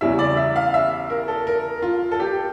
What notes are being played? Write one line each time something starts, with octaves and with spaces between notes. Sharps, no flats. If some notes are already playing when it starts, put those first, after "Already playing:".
E2 C#3 G3 C#4 E4 E5
D5
E5
F5
E5
A#4
A4
A#4
F4
A4
G4